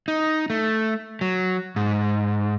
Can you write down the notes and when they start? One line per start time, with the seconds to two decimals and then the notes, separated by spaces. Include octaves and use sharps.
0.08 D#4
0.50 A3
1.21 F#3
1.76 G#2